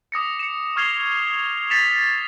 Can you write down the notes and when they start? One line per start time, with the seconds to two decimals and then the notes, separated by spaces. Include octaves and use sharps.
0.12 D6 D#6 A#6 C#7
0.39 C#7 E7
0.76 C#6 F6 G#6 C7 F7 G7
1.27 D#6
1.70 A6 B6 C#7 E7 F7